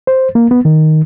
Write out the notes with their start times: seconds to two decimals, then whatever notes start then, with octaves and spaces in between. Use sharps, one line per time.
0.07 C5
0.35 A#3
0.51 B3
0.65 D#3